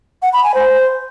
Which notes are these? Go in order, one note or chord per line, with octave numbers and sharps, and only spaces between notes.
F#5
B5
G#5
C5